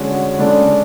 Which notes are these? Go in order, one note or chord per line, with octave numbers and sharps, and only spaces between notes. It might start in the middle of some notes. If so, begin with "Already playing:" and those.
Already playing: D3 G#3 C#4 F#4
C#3 G#3 D4 A4 D5